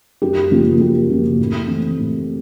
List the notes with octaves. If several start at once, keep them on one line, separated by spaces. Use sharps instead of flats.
F#2 G4
C#3 F3 A#3
F#2 G4
C#3 F3 A#3
A2
E3 A3 C4
A2